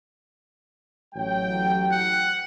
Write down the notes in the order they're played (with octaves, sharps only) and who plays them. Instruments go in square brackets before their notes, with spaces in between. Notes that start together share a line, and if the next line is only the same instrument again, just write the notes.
[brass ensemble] A1 F#3 G5
[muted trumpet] F#5